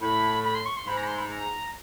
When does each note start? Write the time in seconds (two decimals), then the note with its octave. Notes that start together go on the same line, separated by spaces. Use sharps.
0.01 A2 B5
0.44 B5
0.55 C6
0.66 C#6
0.77 C6
0.86 G#2 B5
0.97 A#5
1.03 B5
1.07 C6
1.18 B5
1.29 A#5